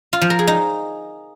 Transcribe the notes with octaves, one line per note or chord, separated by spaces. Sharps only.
F4
F3
A#4
G#4
D#4